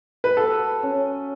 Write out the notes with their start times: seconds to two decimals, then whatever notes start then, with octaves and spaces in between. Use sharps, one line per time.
0.24 B4
0.37 F#4 A4
0.83 C#4